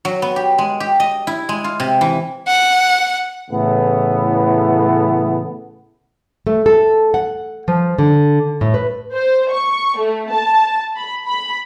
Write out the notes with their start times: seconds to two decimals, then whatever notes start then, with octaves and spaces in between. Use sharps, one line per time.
0.05 F#3
0.22 B3
0.36 G4
0.58 G#3
0.80 G4
1.00 D#5
1.27 E4
1.49 G#3
1.64 F4
1.80 C3
2.01 E3
2.48 F#5
3.50 A2 C#3 E3 A3 B3
6.47 A3
6.66 A4
7.14 F#5
7.68 F3
7.98 D3
8.61 A2
8.74 B4
9.15 C5
9.52 C#6
9.99 A3
10.32 A5
10.96 B5
11.26 B5